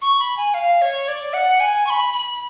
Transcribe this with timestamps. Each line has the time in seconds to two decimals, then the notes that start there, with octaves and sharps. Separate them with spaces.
0.02 C#6
0.19 B5
0.37 G#5
0.54 F5
0.81 C#5
1.08 D5
1.33 F#5
1.60 G#5
1.86 C#6
1.90 B5
2.13 B5